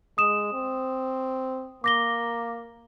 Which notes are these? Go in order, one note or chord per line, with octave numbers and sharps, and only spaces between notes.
G#3 D#6 E7
C4
A#3 D6 A#6 G7